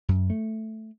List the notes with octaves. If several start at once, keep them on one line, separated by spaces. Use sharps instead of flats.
F#2
A3